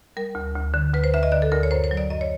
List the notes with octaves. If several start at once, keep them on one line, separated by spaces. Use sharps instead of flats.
G3 A#4
D2
D2
D3
D2 B4
C5
D2 E5
D#5
D3 D5
A4
D2 A#4
C#5
F#2 C5
C5
F#3
D5
F#2 D#5
C#5